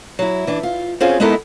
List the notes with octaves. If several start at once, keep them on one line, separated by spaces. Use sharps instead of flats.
F#3 E4
E3 D4
F4
C4 C#4 F4 F#4 G#4
G#3 B3 D#4 E4 A4 A#4